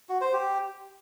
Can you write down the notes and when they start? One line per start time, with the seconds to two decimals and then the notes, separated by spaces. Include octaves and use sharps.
0.09 F#4
0.21 C5
0.33 G4